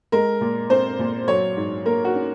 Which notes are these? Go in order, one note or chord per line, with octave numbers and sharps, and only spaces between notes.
G#3 A#4
A#2
C4 C5
A#2
F#3 C#5
G#2
A#3 A#4
F#4
C#4